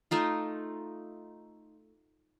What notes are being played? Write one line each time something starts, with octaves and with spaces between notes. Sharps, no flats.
A3 D#4 F4